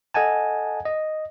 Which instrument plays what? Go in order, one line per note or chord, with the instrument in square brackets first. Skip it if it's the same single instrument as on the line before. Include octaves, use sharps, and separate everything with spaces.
[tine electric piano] A4 D#5 F#5 G#5 A5
D#5